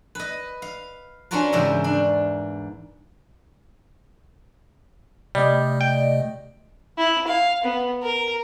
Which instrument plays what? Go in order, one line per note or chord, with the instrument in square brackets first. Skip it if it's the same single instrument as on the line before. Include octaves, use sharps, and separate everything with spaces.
[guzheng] B4 D#5
F5
C#4 D4 F4 F#4 A#4 B4
E2 G#2 C#3 G4 E5 A#5
D4
[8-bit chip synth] C3 A3 [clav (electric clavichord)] G3 [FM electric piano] D5 D#5
[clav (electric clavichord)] G5
[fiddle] E4
F5
B3
A#4